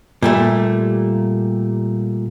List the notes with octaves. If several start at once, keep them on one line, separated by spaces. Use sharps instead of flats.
A#2 G3 A3